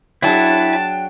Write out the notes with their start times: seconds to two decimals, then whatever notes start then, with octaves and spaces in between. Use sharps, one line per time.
0.22 F#3 D4 E4 G#4 G5 A5